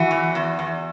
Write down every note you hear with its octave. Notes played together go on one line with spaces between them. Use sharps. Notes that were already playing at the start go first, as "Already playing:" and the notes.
Already playing: E3 F#4
E2
E2
E2